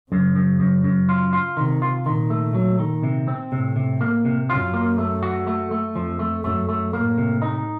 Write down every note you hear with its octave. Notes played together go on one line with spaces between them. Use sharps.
F#2 C#3
F#2
F#2
F#2
F4
F4
C3 D#3
F4
A#2 D#3
A3
F#3
D#3
C3
C4
A2 C3
C3
A#3
C3
F#2 F4
A#3
A3
F#4
A3
A3
F2 F3
A3
F#2 A3
A3
A2 A#3
C3
D#4